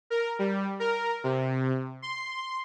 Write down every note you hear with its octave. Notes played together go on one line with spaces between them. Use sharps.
A#4
G3
A#4
C3
C6